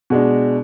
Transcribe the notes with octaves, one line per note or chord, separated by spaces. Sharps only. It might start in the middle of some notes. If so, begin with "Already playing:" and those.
B2 G#3 D4